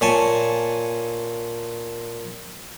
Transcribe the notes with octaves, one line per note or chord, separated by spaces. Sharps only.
A#2 C#5 G#5 A5